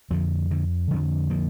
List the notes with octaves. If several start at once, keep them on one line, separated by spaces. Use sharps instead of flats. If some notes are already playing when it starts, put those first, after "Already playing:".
F2 D3 F3
D3
F2 D3 F3
F3 A#3